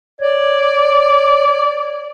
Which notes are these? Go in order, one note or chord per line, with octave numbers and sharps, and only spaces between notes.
C#5 D5